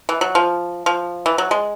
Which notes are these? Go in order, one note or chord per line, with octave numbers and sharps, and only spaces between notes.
E3
F#3
F3
F3
E3
F#3
G#3